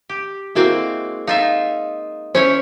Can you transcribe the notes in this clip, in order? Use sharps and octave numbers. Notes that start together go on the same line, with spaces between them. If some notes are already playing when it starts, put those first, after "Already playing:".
G4
G#3 A#3 C4 E4 F#4
D#4 F4 E5 F5
C#4 E4 C5 C#5